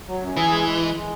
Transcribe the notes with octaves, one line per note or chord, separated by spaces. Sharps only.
F#3
F#2
E3 G#4
G#3
G#3
G#3
G#3